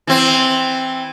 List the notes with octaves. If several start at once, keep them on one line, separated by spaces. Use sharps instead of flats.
E3 C4